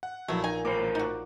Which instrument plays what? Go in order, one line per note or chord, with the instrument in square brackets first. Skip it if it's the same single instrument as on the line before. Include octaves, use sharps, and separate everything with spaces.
[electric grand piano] F#5
[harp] A#1 [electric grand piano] F#3 E4 [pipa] A3 B3
[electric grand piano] D#4 [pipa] G#5
[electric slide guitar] A2 A#4 C5 [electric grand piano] D6
[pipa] D#4 F#4